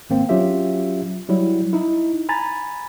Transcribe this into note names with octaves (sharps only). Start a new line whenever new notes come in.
G#1 A#3 C4
F#3 C#4 F4 G4 E5
F#3 G3 E4
D#4 E4
G#5 A#5 B5 A6